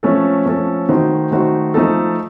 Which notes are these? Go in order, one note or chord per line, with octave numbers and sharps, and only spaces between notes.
F3 A3 C#4 A4
F3 A3 C#4 A4
D#3 A3 D#4 F#4 C5
D#3 A3 D#4 F#4 C5
F3 A3 D#4 A4